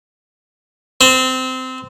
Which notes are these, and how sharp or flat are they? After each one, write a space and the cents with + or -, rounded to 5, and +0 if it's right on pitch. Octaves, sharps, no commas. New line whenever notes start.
C4 -20